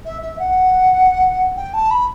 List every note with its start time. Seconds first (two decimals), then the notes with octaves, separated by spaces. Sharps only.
0.05 E5
0.22 E5
0.39 F#5
1.56 G5
1.73 A5
1.90 B5